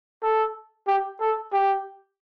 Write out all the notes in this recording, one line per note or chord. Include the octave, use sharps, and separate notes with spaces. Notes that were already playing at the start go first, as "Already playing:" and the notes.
A4
G4
A4
G4